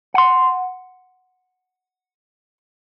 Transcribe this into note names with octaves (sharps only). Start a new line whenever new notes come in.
F#5 C6